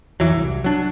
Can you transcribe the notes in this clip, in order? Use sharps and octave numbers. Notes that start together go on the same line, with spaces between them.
F2 E3 F#3
C2
F#3 D4